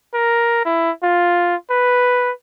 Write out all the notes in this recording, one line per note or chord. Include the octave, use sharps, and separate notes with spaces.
A#4
E4
F4
B4